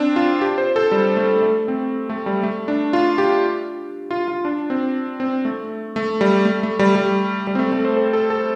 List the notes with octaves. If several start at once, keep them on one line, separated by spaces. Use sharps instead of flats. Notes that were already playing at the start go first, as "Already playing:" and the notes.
Already playing: C4 D4
F4
G4
C5
A4
G3
A3
A3
C4
A3
G3
A3
D4
F4
G4
F4
F4
D4
C4
C4
A3
A3
G3
A3
A3
G3
G3
G3
C4
A3
A3
C5
A4
A4
A4